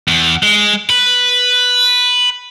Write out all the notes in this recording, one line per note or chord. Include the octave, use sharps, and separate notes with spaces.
E2
G#3
B4